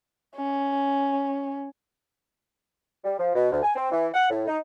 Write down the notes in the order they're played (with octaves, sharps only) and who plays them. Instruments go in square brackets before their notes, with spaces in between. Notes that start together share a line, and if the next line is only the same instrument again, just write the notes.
[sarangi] C#4
[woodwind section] G3
F3
B2
D2
G#5
C4
E3
F#5
A2
D#4